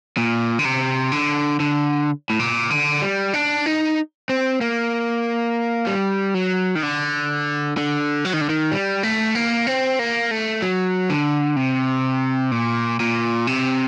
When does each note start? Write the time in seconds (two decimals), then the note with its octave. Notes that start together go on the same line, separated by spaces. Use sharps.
0.17 A#2
0.59 D3
0.65 C3
1.12 D3
1.60 D3
2.30 A2
2.39 A#2
2.70 D3
3.02 G3
3.34 D4
3.66 D#4
4.29 C4
4.61 A#3
5.87 G3
6.34 F#3
6.75 D#3
6.83 D3
7.77 D3
8.25 F#3
8.33 D#3
8.41 D3
8.49 D#3
8.72 G3
9.03 A3
9.35 A#3
9.67 C4
9.99 A#3
10.31 A3
10.62 F#3
11.10 D3
11.56 C3
12.52 A#2
13.00 A#2
13.47 C3